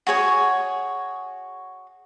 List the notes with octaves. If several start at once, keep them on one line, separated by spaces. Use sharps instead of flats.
F#4 G#4 C#5 G#5